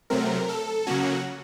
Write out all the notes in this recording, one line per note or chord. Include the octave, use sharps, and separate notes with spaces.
C3 F#3 A3 C4 A#4
A4
C#3 F#3 A#3 C#4 F#4